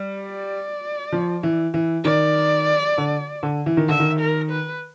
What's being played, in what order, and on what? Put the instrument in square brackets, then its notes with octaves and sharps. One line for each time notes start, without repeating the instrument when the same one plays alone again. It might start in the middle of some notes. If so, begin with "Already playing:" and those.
Already playing: [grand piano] G3
[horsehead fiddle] D5
[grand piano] F3
E3
E3
[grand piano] D#3 [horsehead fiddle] D5
[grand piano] D3
D3
E3
D#3
[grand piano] D3 [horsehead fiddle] E5
[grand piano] D#3
[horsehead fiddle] A#4
B4